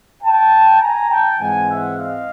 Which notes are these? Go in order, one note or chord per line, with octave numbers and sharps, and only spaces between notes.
G5 A5
G#5 A#5
G5 A5
G#2 E3 G#3 C4 F#5 G#5
E5 F#5
D#5 F5